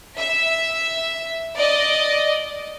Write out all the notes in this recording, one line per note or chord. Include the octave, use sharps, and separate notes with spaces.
E5
D5 D#5